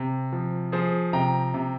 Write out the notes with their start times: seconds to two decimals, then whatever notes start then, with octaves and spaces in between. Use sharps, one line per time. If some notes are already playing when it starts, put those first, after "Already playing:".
Already playing: C3
0.33 F3
0.72 F3 G#4 C5
1.13 C3 G5 A#5
1.54 C3